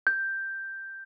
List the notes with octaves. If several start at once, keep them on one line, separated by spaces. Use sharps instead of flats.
G6